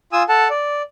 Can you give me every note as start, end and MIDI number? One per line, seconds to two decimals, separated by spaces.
0.13 0.23 65
0.13 0.23 80
0.13 0.23 87
0.13 0.23 88
0.29 0.48 69
0.29 0.48 78
0.29 0.48 81
0.50 0.82 74